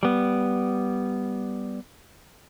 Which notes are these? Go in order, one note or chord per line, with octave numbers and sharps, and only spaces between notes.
G3 B3